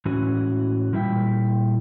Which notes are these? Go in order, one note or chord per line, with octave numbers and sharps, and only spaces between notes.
A2 E3 G#3 C#4 F#4
A#2 G3 E4 E5 G5